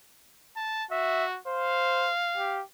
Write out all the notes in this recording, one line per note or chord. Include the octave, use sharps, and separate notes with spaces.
A5
F#4 E5
C5 F5
G4